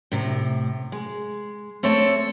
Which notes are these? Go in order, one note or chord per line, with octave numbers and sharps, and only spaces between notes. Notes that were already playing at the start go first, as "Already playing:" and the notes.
A2 C3
G#3
A3 C4 A4 C#5